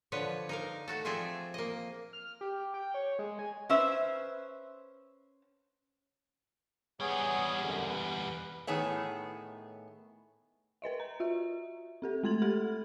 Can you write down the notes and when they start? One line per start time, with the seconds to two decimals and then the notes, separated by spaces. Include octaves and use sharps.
0.12 D3 F3 B4 C#5
0.49 D#4 A#4 F5
0.88 A3 F#4 A4
1.05 F3 C4 G#4 D5 E5
1.54 A#3 D#5
2.13 F6
2.41 G4
2.74 G5
2.94 C#5
3.19 G#3
3.39 G#5
3.69 C#4 B4 C5 E5
7.00 E2 G3 B3 G#4 C#5
7.62 F#2 D3
7.89 B4
8.67 A2 D#3 B3 G#4 C#5 E5
10.82 A#4 B4 D#5 E5
11.00 A#5
11.20 F4 F#4 E5
12.02 C4 G4 A4
12.23 G#3 A3 C6 G#6 A6 F#7
12.42 G4 A4 B5 F6